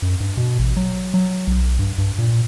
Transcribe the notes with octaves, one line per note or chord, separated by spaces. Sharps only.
F#2
G2
B2
A1
F#3
F#3
B1
G2
G2
A#2